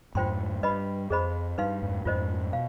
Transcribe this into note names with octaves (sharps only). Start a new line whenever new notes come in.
F2 G#2 F4 C5 G5 C6
G2 B4 D#5 B5
F2 G#4 C5 D#5 B5
G2 D#4 B4 F5 C6
F2 G#2
F2 G#2 F4 C5 D#5
B2 F5